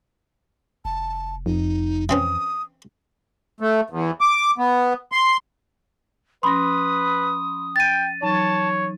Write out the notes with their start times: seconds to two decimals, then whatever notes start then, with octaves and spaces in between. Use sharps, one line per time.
0.85 F1 A5
1.46 F2 D#4
2.09 E3 C4 C#4 D#6
3.60 A3
3.90 E2
4.21 D6
4.58 B3
5.12 C6
6.43 F3 C#4 B4 B5 C6 D#6 A#6
7.76 G5 A6 D#7
8.22 E3 F#3 D#4 C#5 A5